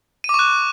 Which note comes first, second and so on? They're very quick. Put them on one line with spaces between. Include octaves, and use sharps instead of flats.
D#7 D6 C#6 F#6